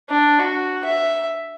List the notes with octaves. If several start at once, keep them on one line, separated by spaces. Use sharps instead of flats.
D4
F#4
E5